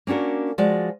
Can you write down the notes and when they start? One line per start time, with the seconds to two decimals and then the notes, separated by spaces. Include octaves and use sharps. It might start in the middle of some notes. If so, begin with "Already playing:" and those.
0.07 A#3 C#4 D4 F#4 A#4
0.58 F3 G#3 F#4 D5